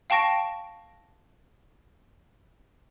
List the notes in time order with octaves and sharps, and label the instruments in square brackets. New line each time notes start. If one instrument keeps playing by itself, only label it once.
[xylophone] F5 G5 A5 C#6 A#6 D7